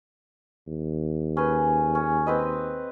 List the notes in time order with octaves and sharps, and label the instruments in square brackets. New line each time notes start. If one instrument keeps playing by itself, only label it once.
[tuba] D#2
[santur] C#4 G#4 B4
C#4
C4 B4 D#5